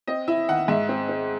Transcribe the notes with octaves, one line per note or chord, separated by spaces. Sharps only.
C4 D#5
E4 E5
D#3 F#5
G#2 E5
C4
C4